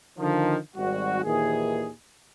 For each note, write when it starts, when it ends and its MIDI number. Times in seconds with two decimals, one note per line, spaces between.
0.19 0.57 50
0.19 0.57 51
0.19 0.57 53
0.76 1.22 32
0.76 1.22 55
0.76 1.22 66
1.24 1.89 39
1.24 1.89 46
1.24 1.89 51
1.24 1.89 52
1.24 1.89 68